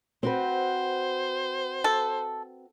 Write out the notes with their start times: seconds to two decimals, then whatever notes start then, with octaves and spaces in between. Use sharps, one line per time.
0.23 C4 F#4 B4 C5
1.84 A4